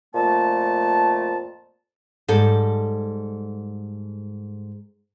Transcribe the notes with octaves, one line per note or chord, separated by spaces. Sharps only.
F2 A#2 A3 A5
G#2 G3 A4